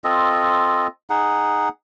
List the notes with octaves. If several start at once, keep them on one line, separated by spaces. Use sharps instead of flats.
C4 F4 A4 D#5
D#4 G#4 F#5